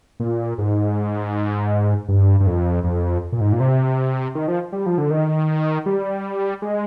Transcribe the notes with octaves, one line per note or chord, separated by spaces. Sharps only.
A#2
G#2
G2
G2
F2
F2
A#2
G#2
A#2
C3
D#3
F3
G3
F3
D3
D#3
G3
G#3